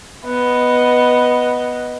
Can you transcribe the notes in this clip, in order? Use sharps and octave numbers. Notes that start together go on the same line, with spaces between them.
B3 D#5